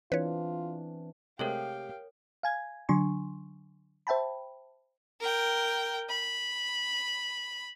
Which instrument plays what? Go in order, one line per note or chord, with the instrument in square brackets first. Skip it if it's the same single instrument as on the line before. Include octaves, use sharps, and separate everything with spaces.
[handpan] E3 C4 D4 [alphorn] F4 [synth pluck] B4 C#5
[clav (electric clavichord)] C3 G#3 A3 [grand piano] G4 [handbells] A#4 C#5 [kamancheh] F5 G5
[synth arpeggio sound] F5 G#5 G#6
D3 F#3 D4 G#5 C6 C#6
C5 E5 G5 A5 B5
[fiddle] A#4 G5
B5